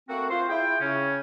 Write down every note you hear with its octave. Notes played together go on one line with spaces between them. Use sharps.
A3 A#3 C4 F#4
F4 C5
E4 G#4 G5
C#3 C#4